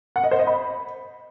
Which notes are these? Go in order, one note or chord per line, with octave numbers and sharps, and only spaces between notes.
F#5
D#5
C5
D#5
B5